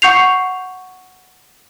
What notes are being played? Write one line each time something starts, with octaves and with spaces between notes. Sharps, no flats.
F#5 C#6 G6 C7 F7